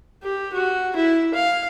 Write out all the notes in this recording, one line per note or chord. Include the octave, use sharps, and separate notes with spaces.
G4
F#4
E4
F5